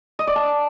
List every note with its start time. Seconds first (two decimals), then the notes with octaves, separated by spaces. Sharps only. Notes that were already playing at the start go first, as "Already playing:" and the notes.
0.19 D#5
0.27 D5
0.36 A5